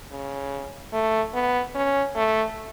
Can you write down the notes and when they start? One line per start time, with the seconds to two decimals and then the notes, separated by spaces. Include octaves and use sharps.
0.11 C#3
0.93 A3
1.34 B3
1.75 C#4
2.15 A3